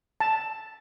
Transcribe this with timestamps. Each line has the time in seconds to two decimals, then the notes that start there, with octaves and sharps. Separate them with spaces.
0.20 A5